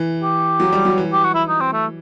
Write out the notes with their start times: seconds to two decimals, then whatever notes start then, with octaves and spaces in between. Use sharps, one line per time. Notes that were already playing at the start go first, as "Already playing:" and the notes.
Already playing: E3
0.23 G4
0.60 F#3
0.72 G3
0.85 F#3
0.98 E3
1.13 G4
1.24 F#4
1.35 E4
1.48 D#4
1.60 C4
1.73 A3